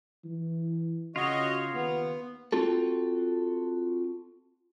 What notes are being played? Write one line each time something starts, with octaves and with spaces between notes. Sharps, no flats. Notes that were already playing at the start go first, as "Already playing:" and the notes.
E3
C#3 F4 F#4 C#5 D#5
D#2 B3
C4 F4 F#4 A4